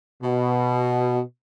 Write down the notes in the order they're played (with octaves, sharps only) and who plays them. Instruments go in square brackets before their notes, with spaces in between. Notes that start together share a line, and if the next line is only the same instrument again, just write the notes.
[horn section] B2